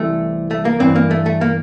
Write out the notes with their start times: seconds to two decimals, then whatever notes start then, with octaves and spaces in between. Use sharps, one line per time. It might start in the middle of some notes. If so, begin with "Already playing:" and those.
Already playing: C2 C3 E3 A3
0.51 A3
0.65 A#3
0.80 G2 E3 C4
0.96 A#3
1.11 A3
1.26 A3
1.41 A#3